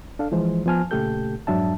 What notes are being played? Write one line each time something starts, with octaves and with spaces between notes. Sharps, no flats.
D4 A4 F5
E3 F3 G#3 C5
F3 B3 C5 G#5 A5 F6
A#2 C#3 A3 G4 A4 G6
F2 G#2 F#3 D4 E5 A5